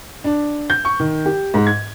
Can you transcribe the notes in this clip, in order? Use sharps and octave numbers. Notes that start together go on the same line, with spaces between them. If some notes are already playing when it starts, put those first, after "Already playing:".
D4
G6
C#6
D#3
G4
G#2
G#6